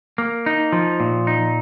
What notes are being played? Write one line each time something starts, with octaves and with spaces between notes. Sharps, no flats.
A#3
D#4
F3
A#2
D#4